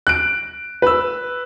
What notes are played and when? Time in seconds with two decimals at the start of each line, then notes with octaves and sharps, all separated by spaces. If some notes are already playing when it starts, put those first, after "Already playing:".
0.07 F#6 D7
0.82 B4 E6